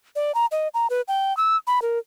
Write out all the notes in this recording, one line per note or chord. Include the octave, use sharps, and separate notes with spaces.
D5
A#5
D#5
A#5
B4
G5
E6
B5
A#4